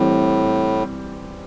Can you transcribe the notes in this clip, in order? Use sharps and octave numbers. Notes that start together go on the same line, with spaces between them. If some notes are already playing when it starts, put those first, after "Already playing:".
Already playing: A2 E3 G3 C4